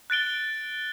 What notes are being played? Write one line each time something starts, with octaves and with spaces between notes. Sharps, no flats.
F#6 A6 D7 G7